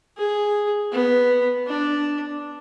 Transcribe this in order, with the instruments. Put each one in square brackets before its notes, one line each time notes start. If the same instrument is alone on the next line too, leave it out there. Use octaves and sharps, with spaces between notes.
[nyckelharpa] G#4
B3
D4